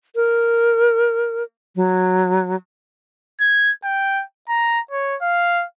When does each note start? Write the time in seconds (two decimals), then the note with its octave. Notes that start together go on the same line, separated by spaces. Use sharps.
0.16 A#4
1.76 F#3
3.41 G#6
3.84 G5
4.49 A#5
4.91 C#5
5.22 F5